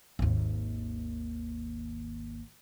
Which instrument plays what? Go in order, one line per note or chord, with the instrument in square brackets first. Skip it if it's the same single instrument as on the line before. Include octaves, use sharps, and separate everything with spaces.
[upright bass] G#1 D#2